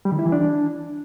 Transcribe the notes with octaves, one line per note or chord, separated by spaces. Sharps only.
G3
D#3
E4
E3
D4